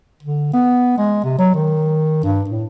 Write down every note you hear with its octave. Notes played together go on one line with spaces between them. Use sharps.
D3
B3
G#3
C3
F#3
D#3
G2
A2